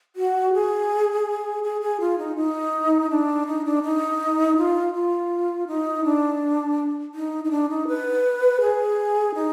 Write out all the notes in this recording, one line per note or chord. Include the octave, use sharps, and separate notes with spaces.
F#4
G#4
G#4
G#4
F4
D#4
D#4
D4
D#4
D4
D#4
F4
F4
D#4
D4
D#4
D#4
D4
D#4
B4
G#4
D#4